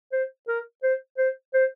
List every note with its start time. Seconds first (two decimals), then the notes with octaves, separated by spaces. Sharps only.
0.12 C5
0.48 A#4
0.83 C5
1.18 C5
1.54 C5